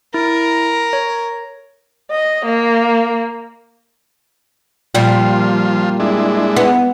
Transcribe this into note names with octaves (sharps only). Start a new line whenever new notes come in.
E4 A#4
C#5
D#5
A#3
A#2 F3 G3 F4
G#3 D4 E4
B3